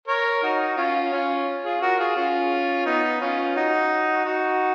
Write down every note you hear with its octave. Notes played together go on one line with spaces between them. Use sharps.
A#4 C#5
D#4 F#4
C#4 F4
C#4 F4
F4 G#4
F#4 A#4
F4 G#4
C#4 F4
B3 D#4
C#4 F4
D#4 F#4
D#4 F#4